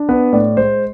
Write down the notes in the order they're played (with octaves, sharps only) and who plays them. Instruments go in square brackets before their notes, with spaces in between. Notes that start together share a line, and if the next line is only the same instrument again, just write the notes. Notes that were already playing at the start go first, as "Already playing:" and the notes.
Already playing: [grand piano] D4
B3 B4
A2 D5
G#3 C5